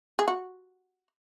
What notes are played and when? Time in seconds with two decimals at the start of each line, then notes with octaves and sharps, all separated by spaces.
0.19 G#4
0.28 F#4